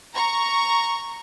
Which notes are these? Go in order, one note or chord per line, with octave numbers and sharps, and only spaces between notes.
A#5 C#6